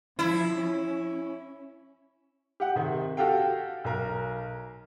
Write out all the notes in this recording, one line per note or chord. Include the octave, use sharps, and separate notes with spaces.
F3 E4
C#4
G4 F#5
C3 D#3
F#4 G4 A4 F5 G5
B1 A#4